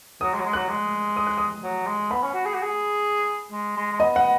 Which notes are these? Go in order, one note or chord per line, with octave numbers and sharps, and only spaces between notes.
F#3 D#6
G#3
F#3
G#3
F#3 F#6
G#3
D#6
F#6
D#6
F#3
G#3
B3 B5
C#4
F#4
G#4
F#4
G#4
G#3
G#3
G#3
B3 D#5
F#5